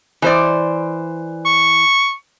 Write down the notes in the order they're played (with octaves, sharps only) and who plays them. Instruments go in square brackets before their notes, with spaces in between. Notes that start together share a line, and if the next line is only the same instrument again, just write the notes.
[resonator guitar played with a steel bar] E3 C5 D5
[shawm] C#6